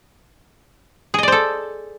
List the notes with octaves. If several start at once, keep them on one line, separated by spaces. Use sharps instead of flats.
G#4 A4 C5 D5 D#5